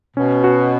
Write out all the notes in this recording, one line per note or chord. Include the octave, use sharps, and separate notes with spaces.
B2 C#4
F#4